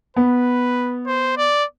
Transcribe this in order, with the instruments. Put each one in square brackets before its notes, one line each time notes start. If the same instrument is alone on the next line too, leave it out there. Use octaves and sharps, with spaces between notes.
[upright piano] B3 [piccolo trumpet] B4
[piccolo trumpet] C5
D5